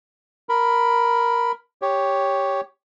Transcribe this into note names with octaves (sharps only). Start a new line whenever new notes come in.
A#4 B5
G4 C#5